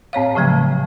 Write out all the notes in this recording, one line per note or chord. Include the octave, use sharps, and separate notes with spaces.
A2 C4 C#5 F5
A2 C#3 F3 F#3 A3